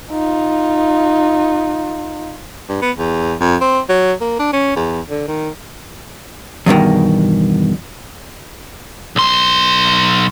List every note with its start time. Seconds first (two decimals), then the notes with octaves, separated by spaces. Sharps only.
0.11 D#4 F4
2.69 G2
2.82 B3
2.98 E2
3.41 F2
3.61 C4
3.89 F#3
4.21 A#3
4.39 D4
4.53 C#4
4.76 E2
5.09 D3
5.28 D#3
6.66 E2 G2 B2 D#3
9.16 B1 C6